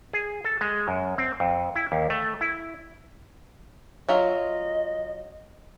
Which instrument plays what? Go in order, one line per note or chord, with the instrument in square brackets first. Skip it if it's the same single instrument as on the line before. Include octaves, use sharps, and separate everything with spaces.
[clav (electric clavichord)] G#4
A4
G#3
F#2
C4
F2
E4
D#2
A3
E4
[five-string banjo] F#3 F4 E5 [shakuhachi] D#5